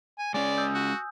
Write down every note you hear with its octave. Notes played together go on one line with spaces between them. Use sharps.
G#5
G#3 C#4 D5 G#5
D#6 E6 G6
F#4